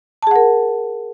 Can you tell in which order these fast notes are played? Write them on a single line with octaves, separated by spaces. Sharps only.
A5 G#4 F#5 A#4